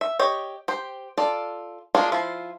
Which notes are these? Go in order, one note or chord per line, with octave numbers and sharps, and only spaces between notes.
E5
G4 C#5 D#5
G4 C5
F4 A4 D5
G#3 A#3 D4 F4 G#4
F3 E4 F4